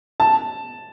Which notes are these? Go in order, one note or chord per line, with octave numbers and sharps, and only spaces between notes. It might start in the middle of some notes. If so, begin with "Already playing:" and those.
A5